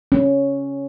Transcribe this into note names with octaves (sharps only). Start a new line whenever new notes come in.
C#4